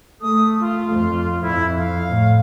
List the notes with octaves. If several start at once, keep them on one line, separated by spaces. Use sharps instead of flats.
A3 D#6
F4
F2
F2 E4
F5
A2